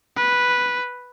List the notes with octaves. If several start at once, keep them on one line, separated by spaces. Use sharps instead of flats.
B4